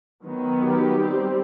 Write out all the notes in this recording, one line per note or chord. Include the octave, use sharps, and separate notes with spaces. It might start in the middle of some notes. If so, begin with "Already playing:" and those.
D#3 F#3 B3
G4
G3 C4